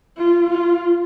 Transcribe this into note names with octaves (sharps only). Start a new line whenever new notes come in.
F4
F4